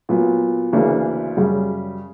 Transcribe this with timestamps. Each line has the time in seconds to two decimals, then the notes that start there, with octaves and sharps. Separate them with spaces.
0.09 A#2 F#3 B3
0.73 D2 C#3 E3 A#3 D4
1.37 F#2 C#3 G3